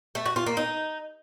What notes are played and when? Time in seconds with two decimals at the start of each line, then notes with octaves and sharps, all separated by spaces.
0.15 A3
0.26 F#4
0.36 F4
0.46 A#3
0.57 D#4